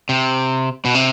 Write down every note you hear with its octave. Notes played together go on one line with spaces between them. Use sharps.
C3
B2
C3